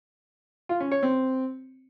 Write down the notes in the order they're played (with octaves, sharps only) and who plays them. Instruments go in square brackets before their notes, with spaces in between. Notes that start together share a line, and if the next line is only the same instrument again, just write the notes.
[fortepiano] F4
C#4
C#5
C4